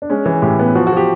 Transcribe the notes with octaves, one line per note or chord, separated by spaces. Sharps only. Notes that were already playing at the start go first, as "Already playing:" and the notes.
D4
G#3 C#4
E3
A2 G4
B3
F3 F#4
F#4
F3 G4